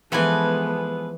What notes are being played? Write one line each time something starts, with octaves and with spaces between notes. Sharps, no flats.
E3 F3 G#3 B3 A4 B4 G#5